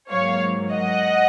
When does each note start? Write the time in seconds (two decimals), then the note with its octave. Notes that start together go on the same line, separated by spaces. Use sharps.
0.10 G#2 F#3 A#3 C#5 F5
0.73 D#5 F#5